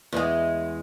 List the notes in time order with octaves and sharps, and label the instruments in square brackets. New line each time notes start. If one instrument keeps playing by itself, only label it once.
[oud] E2 G#3